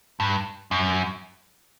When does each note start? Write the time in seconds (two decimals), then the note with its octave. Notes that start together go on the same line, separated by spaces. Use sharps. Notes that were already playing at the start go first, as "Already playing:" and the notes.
0.20 G2
0.71 F#2